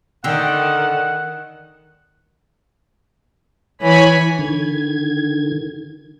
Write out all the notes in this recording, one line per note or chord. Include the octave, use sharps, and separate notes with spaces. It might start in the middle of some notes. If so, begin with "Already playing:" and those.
D3 D#3 F#5 G5
E3 C#5 G#5 B5
D3 D#3 G#6